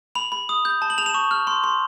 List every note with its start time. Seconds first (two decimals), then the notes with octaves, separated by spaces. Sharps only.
0.15 B5 F7
0.32 B5
0.49 D#6
0.65 G6
0.82 A5
0.90 F#7
0.98 A5 F7
1.06 E7
1.14 C#6
1.31 F6
1.47 C6
1.64 C6